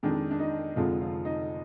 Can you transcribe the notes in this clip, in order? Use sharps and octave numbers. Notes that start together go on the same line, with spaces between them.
F2 D#3 G#3 D4
D4
D#4
F1 F2 D3 F3 G#3 F4
F3 F4
D#4